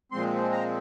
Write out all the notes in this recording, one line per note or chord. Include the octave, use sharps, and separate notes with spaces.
A#2 F3 G#3 C4 C6
A#5